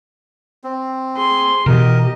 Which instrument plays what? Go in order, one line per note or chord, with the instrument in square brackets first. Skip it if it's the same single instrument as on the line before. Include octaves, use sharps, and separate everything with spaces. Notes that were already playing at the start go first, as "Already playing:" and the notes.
[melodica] C4
[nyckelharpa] G#4 C6
[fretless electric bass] B2 E3 [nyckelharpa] G4 D#5 [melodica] A#4